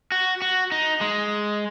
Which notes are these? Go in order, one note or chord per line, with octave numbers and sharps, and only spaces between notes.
F#4
F#4
D#4
G#3